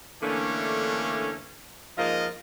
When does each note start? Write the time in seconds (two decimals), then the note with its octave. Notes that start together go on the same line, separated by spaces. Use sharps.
0.22 D3 E3 A3 A#3 C#4 D4
1.98 G#2 F3 A#3 F4 D#5